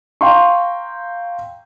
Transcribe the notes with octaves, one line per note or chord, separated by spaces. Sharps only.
F5 G5 A#5 C6 C#6